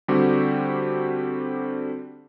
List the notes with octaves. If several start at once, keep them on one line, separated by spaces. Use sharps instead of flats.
D3 G3 C4 F#4 G4